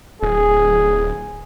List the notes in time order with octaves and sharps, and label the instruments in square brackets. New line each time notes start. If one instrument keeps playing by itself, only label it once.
[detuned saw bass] D1 [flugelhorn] G#4